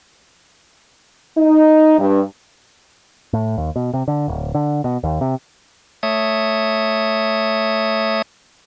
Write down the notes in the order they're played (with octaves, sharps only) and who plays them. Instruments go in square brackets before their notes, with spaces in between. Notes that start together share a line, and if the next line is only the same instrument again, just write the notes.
[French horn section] D#4
G2
[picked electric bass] A2
D#2
B2
C3
D3
D1
D3
B2
D#2
C3
[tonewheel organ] A3 C#5 E5 D#6